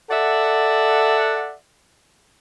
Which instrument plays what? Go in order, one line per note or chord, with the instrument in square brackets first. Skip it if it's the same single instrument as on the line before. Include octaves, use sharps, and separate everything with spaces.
[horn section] A4 D5 E5 F#5